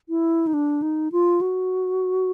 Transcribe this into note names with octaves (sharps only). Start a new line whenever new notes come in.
E4
D#4
D4
D#4
F4
F#4